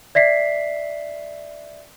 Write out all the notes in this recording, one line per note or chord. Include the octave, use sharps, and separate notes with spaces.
D5 E5 B6 C7